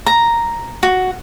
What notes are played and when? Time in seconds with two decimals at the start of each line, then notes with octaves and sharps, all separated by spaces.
0.06 A#5
0.83 F#4